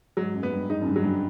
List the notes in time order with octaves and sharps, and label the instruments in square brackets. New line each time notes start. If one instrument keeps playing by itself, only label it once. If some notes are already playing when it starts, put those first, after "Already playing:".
[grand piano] G#2 [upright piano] F#3
[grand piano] F#2
[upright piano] B3
[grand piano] G2
[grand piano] G#2 [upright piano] D#4
[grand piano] F#2
G2
[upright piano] F#3
[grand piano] G2